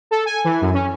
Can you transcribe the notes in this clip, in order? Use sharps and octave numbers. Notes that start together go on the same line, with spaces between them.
A4
G#5
E3
F#2
C#4